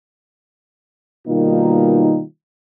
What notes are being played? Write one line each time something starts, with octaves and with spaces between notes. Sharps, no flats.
B2 D#3 G3 A#3 D#4 F4